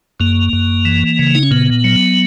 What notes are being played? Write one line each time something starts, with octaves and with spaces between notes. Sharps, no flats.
F#2 A#3
F#2
E3
C#3
D#4
C#4
A#2 B3
F#3